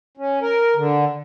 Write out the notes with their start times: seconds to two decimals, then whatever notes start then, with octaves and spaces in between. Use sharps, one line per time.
0.17 C#4
0.41 A#4
0.76 D3